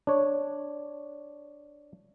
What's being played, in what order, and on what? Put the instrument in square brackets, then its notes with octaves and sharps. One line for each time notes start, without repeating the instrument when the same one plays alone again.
[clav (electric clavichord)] D4 C#5